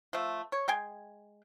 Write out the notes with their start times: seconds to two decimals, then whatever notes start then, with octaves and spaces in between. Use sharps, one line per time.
0.13 F3 A3
0.52 C#5
0.68 G#3 G5 G#5